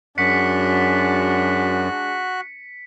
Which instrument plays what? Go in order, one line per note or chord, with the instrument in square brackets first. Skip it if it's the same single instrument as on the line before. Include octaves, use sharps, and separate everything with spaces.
[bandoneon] F#2 [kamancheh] G#3 D4 [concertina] F#4 F#6 [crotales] B6 C#7